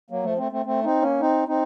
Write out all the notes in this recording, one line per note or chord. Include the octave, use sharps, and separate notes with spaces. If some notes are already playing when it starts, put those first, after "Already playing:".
F#3 A#3
F3 A3
A3 C4
A3 C4
A3 C4
C4 D#4
A#3 C#4
C4 D#4
C4 D#4